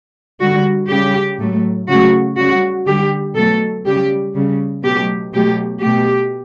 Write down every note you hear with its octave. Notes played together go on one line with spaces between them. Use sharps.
D3 G3 F#4
C#3 G3 G4
A2 F#3 A3
C#3 F#3 A3 F#4
C#3 G3 F#4
D3 G3 G4
B2 F#3 A3 A4
C#3 G3 G4
C#3 G3
B2 F#3 A3 G4
B2 F#3 A3 G4
B2 A3 G4